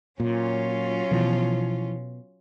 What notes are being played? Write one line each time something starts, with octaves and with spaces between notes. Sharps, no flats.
A#2 F#3 C#4 F4
B2 E3 F3